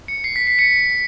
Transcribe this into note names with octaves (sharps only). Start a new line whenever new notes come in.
C#7
C7
B6
C7
C#7